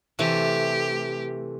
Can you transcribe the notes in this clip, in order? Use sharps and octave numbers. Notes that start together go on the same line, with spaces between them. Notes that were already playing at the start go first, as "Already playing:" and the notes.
C3 E3 A3 G4